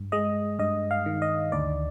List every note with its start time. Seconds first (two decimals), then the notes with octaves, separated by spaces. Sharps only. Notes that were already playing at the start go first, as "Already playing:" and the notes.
Already playing: G2
0.12 G#3 D#5
0.59 G2 D#5
0.91 F5
1.06 D#3
1.22 D#5
1.52 D2 D5